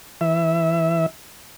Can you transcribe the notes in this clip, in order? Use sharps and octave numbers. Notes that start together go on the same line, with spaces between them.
E3 E5